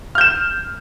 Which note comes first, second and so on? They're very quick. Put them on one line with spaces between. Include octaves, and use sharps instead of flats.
F6 G6 E7